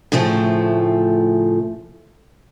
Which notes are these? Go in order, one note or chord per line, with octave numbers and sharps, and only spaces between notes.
A2 C#3 F3 A3